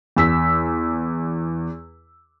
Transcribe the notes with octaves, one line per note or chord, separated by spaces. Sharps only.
E2 E6 B6